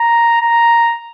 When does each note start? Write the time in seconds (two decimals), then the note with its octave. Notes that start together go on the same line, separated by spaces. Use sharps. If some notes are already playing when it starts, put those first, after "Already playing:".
Already playing: A#5
0.42 A#5